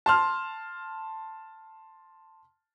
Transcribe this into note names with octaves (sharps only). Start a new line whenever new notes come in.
A5 C6 F6